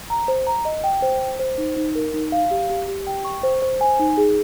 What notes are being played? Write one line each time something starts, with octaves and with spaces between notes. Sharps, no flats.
A#5
C5
A#5
D#5
G5
C5
C5
C5
D#4
D#4
A#4
D#4
F5
G4
G4
G4
G5
C#6
C5
C5
G#5
D#4
G#4